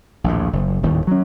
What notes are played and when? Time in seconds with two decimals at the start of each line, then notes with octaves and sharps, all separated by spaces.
0.24 A#1 D#2 A2
0.53 F#1
0.83 D#1 D#2 A2
1.07 F#3 C#4